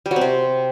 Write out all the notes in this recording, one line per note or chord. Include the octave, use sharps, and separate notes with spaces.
G3
F#3
C4
C3